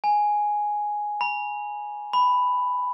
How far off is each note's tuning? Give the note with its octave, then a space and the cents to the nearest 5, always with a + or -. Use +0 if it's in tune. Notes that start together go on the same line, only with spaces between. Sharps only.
G#5 +0
B5 -35
B5 +5